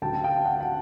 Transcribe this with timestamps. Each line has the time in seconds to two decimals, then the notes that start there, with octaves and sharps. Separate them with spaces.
0.02 D2 D3 F#3 G5 A5
0.24 F5 G5
0.46 F#5
0.61 F#5